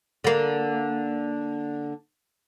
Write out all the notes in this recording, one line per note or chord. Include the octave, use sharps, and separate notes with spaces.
D3 A#3